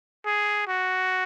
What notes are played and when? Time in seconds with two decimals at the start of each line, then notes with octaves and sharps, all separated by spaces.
0.26 G#4
0.68 F#4